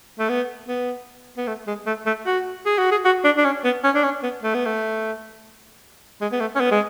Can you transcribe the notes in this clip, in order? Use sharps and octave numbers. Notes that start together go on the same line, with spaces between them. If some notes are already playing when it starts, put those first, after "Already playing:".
A3
B3
B3
B3
A3
G#3
A3
A3
F#4
G#4
F#4
G#4
F#4
D4
D4
C#4
B3
C#4
D4
C#4
B3
A3
B3
A3
G#3
B3
A3
C#4
B3
G#3